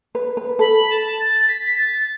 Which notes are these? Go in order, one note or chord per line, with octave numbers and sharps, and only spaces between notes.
B4
B4
A4 B5
A5
A6
B6
A6